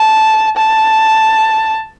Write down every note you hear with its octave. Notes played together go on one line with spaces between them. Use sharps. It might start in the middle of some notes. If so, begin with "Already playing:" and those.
Already playing: A5
A5